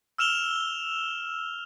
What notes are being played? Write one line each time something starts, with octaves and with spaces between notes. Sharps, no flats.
E6 F6 E7 F7 G7